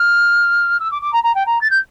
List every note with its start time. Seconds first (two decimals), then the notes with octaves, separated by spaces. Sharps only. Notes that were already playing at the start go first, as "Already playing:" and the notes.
Already playing: F6
0.80 E6
0.91 D6
1.02 D6
1.13 A#5
1.23 A#5
1.35 G5
1.46 A#5
1.61 A6
1.70 G6